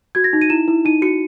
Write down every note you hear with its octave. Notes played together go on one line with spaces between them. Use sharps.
F#4 G#6
A#6
D#4
D#7
E4 E7
E4
D#4 D#7
F#4 C#7